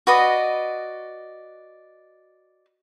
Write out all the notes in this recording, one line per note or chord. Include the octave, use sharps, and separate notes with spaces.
F#4 B4 D5 D#5